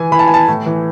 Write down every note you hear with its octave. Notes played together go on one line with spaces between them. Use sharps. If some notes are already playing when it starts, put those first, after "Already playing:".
Already playing: E3 E4 G#5
E3 B5
A5
G#5
B3 A5
A2
E3